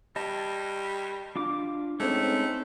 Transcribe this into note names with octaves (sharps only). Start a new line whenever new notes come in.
G3 D#5 A5
D4 F4 D6
G#3 A3 C4 C#4 D#4 C5